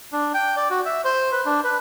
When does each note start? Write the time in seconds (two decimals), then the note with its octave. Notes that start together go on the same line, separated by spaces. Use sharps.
0.12 D4
0.34 G5
0.57 D5
0.70 F#4
0.85 E5
1.05 C5
1.32 B4
1.46 D4
1.64 B4